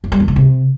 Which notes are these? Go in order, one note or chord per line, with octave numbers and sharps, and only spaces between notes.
F#2
G3
E2
B2
C3